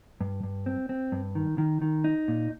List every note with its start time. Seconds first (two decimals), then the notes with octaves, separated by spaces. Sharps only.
0.21 G2
0.43 G2
0.66 C4
0.89 C4
1.12 G2
1.35 D#3
1.58 D#3
1.82 D#3
2.04 D#4
2.28 A#2